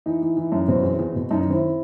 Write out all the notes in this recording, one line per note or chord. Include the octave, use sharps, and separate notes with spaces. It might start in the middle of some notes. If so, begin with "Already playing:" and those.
E3 D#4
E3
E3
F#2
B2 C4
E2
E2
B2
F#2 D#4
D#4
D#3 C4 E4